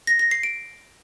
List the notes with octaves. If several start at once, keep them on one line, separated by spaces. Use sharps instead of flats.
A#6
A#6
C7
D7